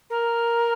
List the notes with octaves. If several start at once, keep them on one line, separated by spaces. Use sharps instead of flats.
A#4